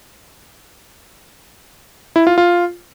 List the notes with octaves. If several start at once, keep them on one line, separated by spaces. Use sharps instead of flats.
E4
F4
F4